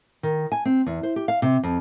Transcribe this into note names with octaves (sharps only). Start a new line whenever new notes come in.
D#3
G#5
C4
E2
C5
G4
F5
C3
F2